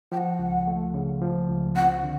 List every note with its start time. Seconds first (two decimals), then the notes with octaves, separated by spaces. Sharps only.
0.12 F3 G5
0.17 F#5
0.39 C#2
0.67 A3
0.94 C#3
1.22 F3
1.49 C#2
1.76 C4 F#5
2.03 D3